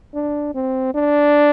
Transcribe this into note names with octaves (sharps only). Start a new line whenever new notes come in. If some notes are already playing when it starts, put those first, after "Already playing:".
D4
C4
D4